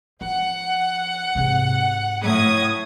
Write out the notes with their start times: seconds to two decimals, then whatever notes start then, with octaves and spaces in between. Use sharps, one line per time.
0.21 F3 F#5
1.35 G#2 C3
2.22 A2 D#6 G#6